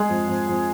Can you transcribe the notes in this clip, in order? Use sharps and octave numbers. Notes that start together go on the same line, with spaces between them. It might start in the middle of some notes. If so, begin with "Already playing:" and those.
Already playing: G#3 G#4
F2
F2
F2